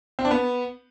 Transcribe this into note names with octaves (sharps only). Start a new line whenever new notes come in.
C4
D4
B3